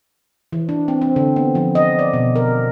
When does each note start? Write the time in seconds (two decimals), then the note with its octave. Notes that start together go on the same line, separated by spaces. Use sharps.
0.52 E3
0.69 D4
0.88 C4
1.02 C4
1.16 D3
1.36 B3
1.55 F3
1.75 D#5
1.99 D5
2.13 B2
2.36 A#4